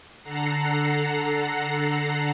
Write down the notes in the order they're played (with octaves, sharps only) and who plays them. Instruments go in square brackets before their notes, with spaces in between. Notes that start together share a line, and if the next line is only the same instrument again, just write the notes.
[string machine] D3 A4 F#5 A#5 C7